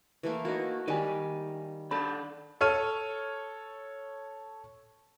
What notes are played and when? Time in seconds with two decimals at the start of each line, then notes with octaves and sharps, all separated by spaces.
0.23 E3 A3 A#3
0.45 A#3 D#4 F#4
0.88 D#3 G3 D#4 G#5
1.91 D#3 D4 A4 B5
2.61 A4 C#5 F6 D#7